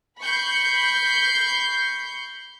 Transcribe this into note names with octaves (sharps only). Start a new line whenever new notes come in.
B5 C#6 G6 C7